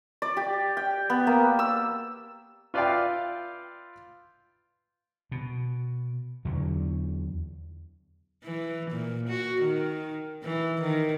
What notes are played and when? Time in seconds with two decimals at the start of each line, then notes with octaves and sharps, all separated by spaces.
0.22 D5
0.37 G4
0.77 G5
1.10 B3
1.27 A#3
1.59 E6
2.74 F4 B4 D5 E5 F5 G5
5.32 B2
6.45 E2 D3 F#3
8.44 E3
8.91 A#2
9.28 F#4
9.61 D#3
10.43 E3
10.81 D#3